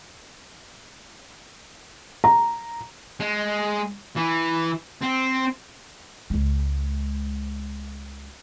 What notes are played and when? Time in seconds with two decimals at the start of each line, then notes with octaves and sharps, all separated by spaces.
2.24 A#5
3.20 G#3
4.16 E3
5.01 C4
6.30 C#2 G#3